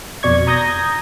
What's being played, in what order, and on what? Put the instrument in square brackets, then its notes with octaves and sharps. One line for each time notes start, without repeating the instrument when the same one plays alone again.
[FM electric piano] F2 B2 D5 C#6 G#6
A#5 D#6 G6 G#6 A#6